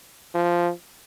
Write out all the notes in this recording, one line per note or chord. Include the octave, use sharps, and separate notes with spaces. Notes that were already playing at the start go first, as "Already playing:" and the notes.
F3